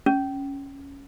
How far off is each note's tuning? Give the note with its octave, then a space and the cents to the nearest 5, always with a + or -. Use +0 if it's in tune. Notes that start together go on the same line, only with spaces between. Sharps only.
C#4 -5